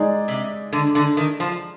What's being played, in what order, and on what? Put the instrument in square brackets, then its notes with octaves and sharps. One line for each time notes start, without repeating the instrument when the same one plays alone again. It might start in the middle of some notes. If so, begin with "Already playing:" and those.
Already playing: [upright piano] G#3 D#4 G#4 D5
[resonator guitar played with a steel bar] C3
D3
D3
D#3
F3